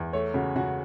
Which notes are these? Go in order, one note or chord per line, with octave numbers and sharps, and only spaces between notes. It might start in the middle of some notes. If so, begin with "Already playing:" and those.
Already playing: E2
A3 C#5
C#3 F#4
C#3 F#4